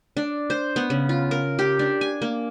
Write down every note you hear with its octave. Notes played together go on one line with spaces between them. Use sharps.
D4
C5
B3
C#3
F4
A#4
G4
D4
G#5
A#3